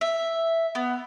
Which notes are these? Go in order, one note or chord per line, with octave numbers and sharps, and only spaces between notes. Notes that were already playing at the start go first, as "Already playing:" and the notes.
E5
B3